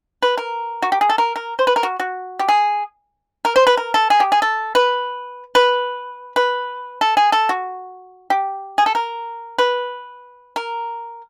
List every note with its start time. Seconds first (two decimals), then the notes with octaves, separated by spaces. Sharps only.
0.22 B4
0.37 A#4
0.82 F#4
0.92 G4
1.01 G#4
1.09 A4
1.18 A#4
1.36 A#4
1.59 C5
1.67 B4
1.76 A#4
1.83 F#4
2.00 F#4
2.39 G4
2.48 G#4
3.45 A#4
3.56 C5
3.67 B4
3.77 A#4
3.94 A4
4.10 G#4
4.20 G4
4.32 G#4
4.42 A4
4.75 B4
5.55 B4
6.36 B4
7.01 A4
7.17 G#4
7.32 A4
7.49 F#4
8.30 G4
8.78 G#4
8.86 A4
8.95 A#4
9.58 B4
10.56 A#4